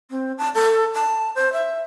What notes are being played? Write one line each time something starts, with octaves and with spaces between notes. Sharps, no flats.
C4
A5
A4
A5
C5
E5